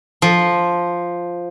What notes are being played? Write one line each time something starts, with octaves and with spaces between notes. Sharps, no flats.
F3